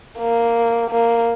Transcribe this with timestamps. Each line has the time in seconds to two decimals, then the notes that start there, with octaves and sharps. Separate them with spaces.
0.19 A#3
0.90 A#3